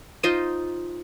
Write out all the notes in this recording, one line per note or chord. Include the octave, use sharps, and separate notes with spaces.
D#4 F4 C5 D#5